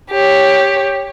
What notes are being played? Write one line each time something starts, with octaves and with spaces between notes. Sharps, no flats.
G4 C#5